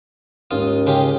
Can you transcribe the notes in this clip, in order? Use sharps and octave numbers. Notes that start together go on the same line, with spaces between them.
D#2 G#2 C#4 F4 D#6
C#3 F4 G4